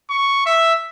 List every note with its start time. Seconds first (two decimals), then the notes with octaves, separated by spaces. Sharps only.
0.10 C#6
0.46 E5